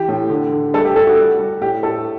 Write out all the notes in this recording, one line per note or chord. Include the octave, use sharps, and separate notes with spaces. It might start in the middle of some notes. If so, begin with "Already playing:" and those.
Already playing: E3 G4
A2
D3
D3
G3 A3 A4
G4
G3 A3 A4
F#4
G3
G3
A2 G4
A2 A3 A4